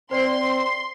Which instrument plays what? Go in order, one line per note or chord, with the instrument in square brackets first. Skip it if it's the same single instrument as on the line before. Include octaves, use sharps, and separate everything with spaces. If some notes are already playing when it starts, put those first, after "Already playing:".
[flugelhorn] C4 [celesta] C5 D5 C7 [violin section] C6